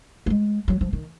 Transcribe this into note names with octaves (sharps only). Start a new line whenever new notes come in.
A#3
G#3
F#3
F3
D#3